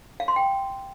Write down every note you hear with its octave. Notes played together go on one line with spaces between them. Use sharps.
F5
C6
G5